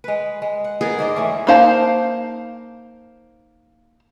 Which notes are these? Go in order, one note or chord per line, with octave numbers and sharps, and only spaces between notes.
G#3 B4
G#3
F#5
B3 G#4 A#4
G#2 C5 D5
E3 A3 C#4
A#3 D#4 C5 F5 A5